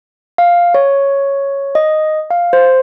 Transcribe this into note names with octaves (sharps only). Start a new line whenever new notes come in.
F5
C#5
D#5
F5
C5